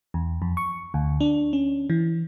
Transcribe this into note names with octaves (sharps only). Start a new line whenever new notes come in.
E2
F2
C#6
D2
D4
C#4
E3